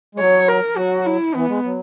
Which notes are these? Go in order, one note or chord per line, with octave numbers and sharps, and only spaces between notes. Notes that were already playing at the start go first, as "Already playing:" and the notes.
G#3
F#3 C#5
A#4
F#3 F#4
E4
E3 B3
G#3
F#3